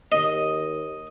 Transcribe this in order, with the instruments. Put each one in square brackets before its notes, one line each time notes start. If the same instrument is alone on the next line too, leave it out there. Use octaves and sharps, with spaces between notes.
[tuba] D#2 [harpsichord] D#5